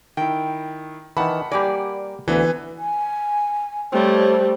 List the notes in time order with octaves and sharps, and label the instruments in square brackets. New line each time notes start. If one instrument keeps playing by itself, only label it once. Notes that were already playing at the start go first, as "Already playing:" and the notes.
[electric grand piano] D#3 E4 [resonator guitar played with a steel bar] G5
[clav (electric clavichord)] D#3 E3 [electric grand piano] F#5 B5 [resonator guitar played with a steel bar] A5
[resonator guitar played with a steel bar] G3 A#3 D5 [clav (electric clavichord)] G4 G#5
[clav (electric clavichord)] D2 [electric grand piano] E3 B3 B4
[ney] G#5
[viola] G3 A3 [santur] C4 C5 [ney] C#5